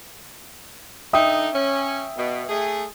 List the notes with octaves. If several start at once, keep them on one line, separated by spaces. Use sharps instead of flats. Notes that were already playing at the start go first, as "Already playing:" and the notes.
D3 D#4 E5 G5 D#6
C#4
B2
A3 G#4